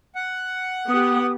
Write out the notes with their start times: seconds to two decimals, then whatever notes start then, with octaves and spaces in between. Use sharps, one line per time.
0.15 F#5
0.89 B3 G4 D#6